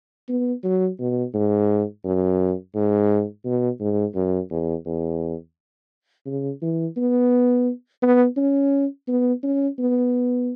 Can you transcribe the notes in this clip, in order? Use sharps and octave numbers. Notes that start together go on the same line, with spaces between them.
B3
F#3
B2
G#2
F#2
G#2
B2
G#2
F#2
E2
E2
C#3
E3
B3
B3
C#4
B3
C#4
B3